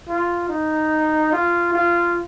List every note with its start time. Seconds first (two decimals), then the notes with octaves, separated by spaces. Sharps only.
0.09 F4
0.49 D#4
1.32 F4
1.73 F4